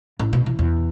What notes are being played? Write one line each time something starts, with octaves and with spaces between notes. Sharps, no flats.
A1
B2
E3
E2